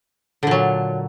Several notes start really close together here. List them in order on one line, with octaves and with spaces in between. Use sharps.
D3 A#2 F#3